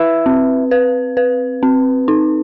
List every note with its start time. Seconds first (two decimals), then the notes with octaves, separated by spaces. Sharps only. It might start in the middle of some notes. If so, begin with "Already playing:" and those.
Already playing: E4 B4
0.26 C4
0.71 B4
1.17 B4
1.63 C4
2.08 D#4